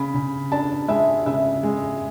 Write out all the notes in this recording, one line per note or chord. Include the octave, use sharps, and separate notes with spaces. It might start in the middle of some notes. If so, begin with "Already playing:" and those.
Already playing: C#3 B5
C#3
D4 A5
G#3 E5
C#3 E5
G#3